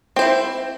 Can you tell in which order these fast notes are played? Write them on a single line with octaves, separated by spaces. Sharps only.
C4 C5 E4